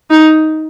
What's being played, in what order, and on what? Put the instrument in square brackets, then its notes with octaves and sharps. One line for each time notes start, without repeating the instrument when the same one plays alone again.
[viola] D#4